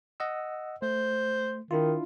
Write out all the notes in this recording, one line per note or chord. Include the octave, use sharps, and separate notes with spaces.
D#5 F#5 E6
A3 C5
D#3 D4 E4 F4